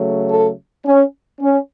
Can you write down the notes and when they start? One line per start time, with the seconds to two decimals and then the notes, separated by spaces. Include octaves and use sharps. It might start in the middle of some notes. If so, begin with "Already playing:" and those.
Already playing: C#3 F#3 A3
0.30 A4
0.86 C#4
1.40 C#4